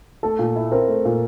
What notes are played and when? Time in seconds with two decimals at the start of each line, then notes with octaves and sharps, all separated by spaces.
0.23 A3 A4
0.39 A#2
0.56 E4
0.72 C4 A#4
0.88 A3
1.05 A#2